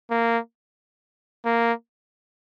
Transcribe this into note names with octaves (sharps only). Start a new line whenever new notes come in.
A#3
A#3